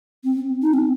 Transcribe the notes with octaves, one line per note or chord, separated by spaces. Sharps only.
C4
D#4
C4